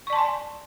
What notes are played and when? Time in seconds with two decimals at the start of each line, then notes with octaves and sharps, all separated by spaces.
0.07 C#6
0.10 D5
0.13 A5
0.16 C6
0.18 G#5